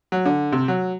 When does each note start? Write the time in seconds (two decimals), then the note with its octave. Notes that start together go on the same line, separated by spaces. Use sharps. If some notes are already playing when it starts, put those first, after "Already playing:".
0.12 F#3
0.26 D3
0.52 C3
0.68 F#3